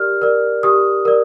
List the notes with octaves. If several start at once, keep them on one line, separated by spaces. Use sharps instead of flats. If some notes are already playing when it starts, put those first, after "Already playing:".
Already playing: G4 A#4 D5 F6
A#4 D5
G4 D#6
A#4 D5